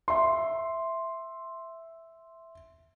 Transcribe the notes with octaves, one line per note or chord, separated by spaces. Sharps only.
E5 C6